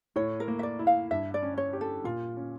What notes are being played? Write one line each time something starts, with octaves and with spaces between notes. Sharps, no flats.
A2 C#5
A#4
A#3
E5
D5
E4
F5
G2 E5
D5
C#4
C#5
G4
A4
A#2 F4
C#4